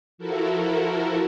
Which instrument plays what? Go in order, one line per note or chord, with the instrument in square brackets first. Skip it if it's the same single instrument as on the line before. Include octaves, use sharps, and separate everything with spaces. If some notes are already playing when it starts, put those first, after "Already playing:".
[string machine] F3 E4 F#4 A4 A#4